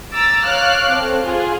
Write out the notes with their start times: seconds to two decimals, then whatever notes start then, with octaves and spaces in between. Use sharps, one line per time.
0.12 A#5 D6 E6 A6
0.45 C#5 F5 D6 F6 F#6
0.91 C4 A4
1.24 F4 G#4